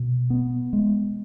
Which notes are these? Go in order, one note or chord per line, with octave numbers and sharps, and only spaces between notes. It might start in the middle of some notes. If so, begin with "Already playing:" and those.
Already playing: B2
B3
G#3